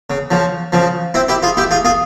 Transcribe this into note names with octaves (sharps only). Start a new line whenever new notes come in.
C#3
C#3 F3
C#3 F3
C4 E4
E4 G4
F4 G#4
E4 G4
F4 G#4
F4 G#4